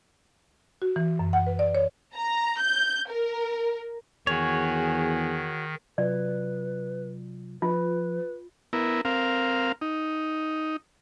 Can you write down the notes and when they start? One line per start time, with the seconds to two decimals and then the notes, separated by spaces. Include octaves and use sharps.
0.82 F#4
0.96 E3
1.19 F#2
1.33 F#5
1.47 B4
1.59 D5
1.75 C#5
2.16 A#5
2.61 G6
3.12 A#4
4.27 E2 D#3 F#4 G#4 C#5
5.98 C3 F#3 F4 B4 D5
7.62 F3 F4 B4
8.73 B3 E4 A#4
9.05 C4 A#4 F5
9.81 D#4